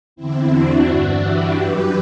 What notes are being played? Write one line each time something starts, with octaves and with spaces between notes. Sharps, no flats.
E2 D3 C4 E4
D4 F#4
G2 E3
E4 G4
F#2 E3 G4 B4